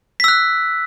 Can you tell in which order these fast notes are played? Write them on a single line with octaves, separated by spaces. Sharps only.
B6 E6 F#6